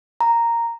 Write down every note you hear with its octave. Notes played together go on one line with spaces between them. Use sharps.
A#5